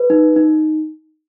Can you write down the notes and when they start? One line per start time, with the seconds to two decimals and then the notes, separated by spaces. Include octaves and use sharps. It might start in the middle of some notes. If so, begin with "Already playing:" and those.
Already playing: B4
0.10 D#4
0.36 D#4